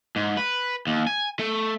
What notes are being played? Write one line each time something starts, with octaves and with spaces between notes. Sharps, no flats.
G#2
B4
D#2
G#5
A3